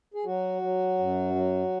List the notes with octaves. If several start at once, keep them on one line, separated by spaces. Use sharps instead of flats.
G#4
F#3 F#4
F#3
F#2
F#3